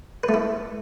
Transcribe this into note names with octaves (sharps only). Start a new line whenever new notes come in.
B4
A3
E4